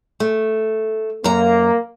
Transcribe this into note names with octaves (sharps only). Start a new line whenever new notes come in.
A3
F#2 A#3 A#5